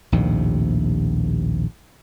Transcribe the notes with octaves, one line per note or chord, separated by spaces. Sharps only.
A#1 D#2 A2 C3